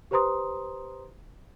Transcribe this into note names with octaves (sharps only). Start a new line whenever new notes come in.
G4 B4 C5 A#5 C6 D#6